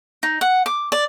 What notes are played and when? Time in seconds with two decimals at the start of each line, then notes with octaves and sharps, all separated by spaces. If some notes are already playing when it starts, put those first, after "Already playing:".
0.23 D#4
0.41 F#5
0.66 D6
0.92 D5